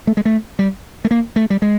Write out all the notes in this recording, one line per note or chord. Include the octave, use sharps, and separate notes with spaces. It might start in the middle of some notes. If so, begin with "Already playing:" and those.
A3
G#3
A3
G3
A3
A#3
A3
G3
G#3